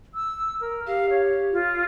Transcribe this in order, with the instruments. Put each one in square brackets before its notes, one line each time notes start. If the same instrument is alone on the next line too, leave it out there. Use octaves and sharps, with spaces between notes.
[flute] E6
A#4
[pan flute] G4 [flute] F5
[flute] C#5
F4